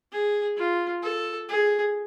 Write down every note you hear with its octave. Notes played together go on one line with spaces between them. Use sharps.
G#4
F4
A4
G#4